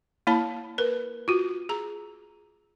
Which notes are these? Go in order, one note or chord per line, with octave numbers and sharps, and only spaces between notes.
A#3 E4 C#5 A5 B5
A#4 B4
F4 F#4
G#4 A#5